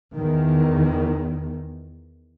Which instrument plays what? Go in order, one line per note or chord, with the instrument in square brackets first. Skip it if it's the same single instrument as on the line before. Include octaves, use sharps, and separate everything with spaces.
[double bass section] E2 D#3